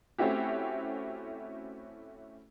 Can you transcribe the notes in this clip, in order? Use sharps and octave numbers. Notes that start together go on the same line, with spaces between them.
A3 C4 C#4 E4 F#4 G4